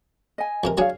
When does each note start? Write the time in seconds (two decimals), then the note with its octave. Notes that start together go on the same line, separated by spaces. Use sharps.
0.38 D#5 G#5
0.64 F2 C3 A#4
0.78 F#3 D4 G#4 C#5 F5